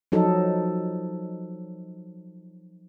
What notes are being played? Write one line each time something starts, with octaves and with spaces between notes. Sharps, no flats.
F3 F#3 D#4 A4